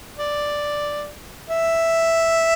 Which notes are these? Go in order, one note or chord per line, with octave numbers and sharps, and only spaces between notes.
D5
E5